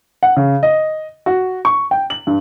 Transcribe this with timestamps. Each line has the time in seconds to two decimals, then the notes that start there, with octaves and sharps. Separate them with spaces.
0.23 F#5
0.37 C#3
0.63 D#5
1.26 F#4
1.65 C#6
1.91 G5
2.10 F#7
2.27 G2